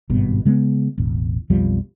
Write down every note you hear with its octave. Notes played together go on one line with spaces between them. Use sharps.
G#1 G2 B2
C#3 G#3 A3 B3
E1 A1
B1 F2 F3 G3